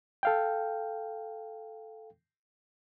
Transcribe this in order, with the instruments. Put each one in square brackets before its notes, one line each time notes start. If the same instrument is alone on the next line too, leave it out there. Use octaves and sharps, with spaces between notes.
[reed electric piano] A4 F5 G5